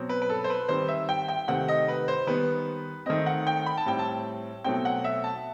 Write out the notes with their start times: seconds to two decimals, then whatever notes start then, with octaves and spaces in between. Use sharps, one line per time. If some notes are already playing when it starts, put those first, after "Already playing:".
Already playing: B2 F#3 C4
0.09 B4
0.22 B4
0.29 A4
0.44 C5
0.50 B4
0.68 D#3 G3 C4 C5
0.88 E5
1.09 G5
1.29 G5
1.48 C3 D#3 A3 C4 F#5
1.68 D#5
1.88 B4
2.08 C5
2.27 D#3 G3 B3 B4
3.06 D#3 A3 C4 D#5
3.26 F#5
3.47 G5
3.66 B5
3.77 A5
3.86 A2 G3 C4 G5
3.99 A5
4.64 B2 F#3 A3 C4 G5
4.85 F#5
5.04 E5
5.24 A5